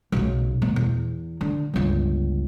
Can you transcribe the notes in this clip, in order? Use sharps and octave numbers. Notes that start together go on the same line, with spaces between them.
B1 C#3
B2
E2
D3
G1 C#2